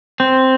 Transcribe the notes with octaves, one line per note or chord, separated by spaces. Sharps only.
C4